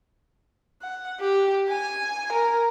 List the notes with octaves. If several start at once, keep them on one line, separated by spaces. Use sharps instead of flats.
F#5
G4
G#5
A#4